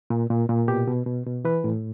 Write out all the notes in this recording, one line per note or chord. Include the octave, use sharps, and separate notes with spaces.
A#2
A#2
A#2
B2 G4
B2
B2
B2
E3 B4
A2